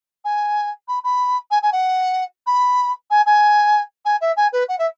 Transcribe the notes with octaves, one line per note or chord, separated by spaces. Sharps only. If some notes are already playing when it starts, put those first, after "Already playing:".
G#5
B5
B5
G#5
G#5
F#5
B5
G#5
G#5
G#5
E5
G#5
B4
F#5
E5